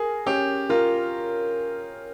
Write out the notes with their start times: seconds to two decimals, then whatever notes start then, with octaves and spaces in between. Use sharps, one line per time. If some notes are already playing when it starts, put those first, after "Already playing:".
Already playing: G#4 A#4
0.26 C#4 G4
0.69 F4 A#4